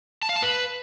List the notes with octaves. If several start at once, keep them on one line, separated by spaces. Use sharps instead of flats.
A5
F5
A5
B4